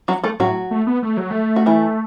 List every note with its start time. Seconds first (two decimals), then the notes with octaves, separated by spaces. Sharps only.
0.08 F#3 F#4
0.23 A3 A4
0.40 A2 F#3 F#4
0.71 A3
0.87 B3
1.03 A3
1.17 F#3
1.31 A3
1.56 F#4
1.66 E3 E4